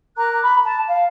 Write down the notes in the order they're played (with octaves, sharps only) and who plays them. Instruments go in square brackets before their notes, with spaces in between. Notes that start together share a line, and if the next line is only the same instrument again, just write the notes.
[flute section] A#4 A#5 D6 F#6
B5
A5
F5